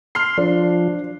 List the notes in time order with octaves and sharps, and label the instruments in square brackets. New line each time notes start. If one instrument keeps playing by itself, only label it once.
[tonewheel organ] C6 [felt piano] F6 C7
[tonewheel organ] F3 [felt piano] D4